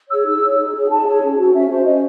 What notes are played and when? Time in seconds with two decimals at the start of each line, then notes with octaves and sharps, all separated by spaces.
0.10 G#4 C#5 E6
0.26 D#4 E6
0.42 G#4 C#5
0.58 D#4
0.74 G#4 C#5
0.90 D#4 A5
1.06 G#4 C#5
1.21 C#4
1.38 F#4 C5
1.54 C#4 E5
1.70 F#4 C5
1.85 C#4 D#5